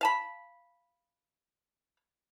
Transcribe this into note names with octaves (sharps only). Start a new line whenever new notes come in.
F5 A5 B5